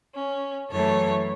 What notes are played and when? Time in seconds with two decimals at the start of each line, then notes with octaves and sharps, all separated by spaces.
0.16 C#4
0.71 F#2 E3 A3 A4 C#5